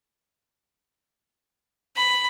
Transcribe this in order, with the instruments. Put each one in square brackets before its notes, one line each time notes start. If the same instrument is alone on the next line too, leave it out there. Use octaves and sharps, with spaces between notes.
[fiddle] B5